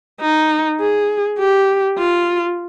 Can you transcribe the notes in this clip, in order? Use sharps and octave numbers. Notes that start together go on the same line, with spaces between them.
D#4
G#4
G4
F4